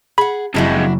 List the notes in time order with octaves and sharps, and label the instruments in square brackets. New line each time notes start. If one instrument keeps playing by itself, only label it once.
[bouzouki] G#4 F#5 [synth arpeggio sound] B5
[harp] F#1 [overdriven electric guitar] F2 G#3 [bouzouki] D4 E4 F#4